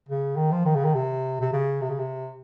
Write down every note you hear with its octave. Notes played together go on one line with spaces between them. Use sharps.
C#3
D#3
F3
D#3
C#3
D#3
C3
C3
C#3
C3
C#3
C3